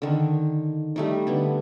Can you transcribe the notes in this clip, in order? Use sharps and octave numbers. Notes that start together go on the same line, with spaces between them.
D3 D#3
G3 A3 D#4
D3 B3